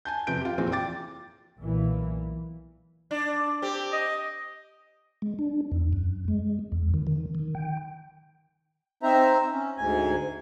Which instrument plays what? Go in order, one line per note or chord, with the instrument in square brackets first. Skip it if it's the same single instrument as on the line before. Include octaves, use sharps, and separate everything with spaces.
[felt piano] G#5 A5 G6
F2 C3 B4 G6 D7
F4 G4
F1 A#2 E3 C4 G#4
G5 D6 A6
[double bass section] B1 A#2 E3
[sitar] D4
C4 G4
[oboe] D#5
[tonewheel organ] G#3
D4
E2
F#2
G#3
E2
D#3
D#3
D#3
G5
[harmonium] C4 D#4 C5 E5 A#5
C#4
D2 G#2 G#5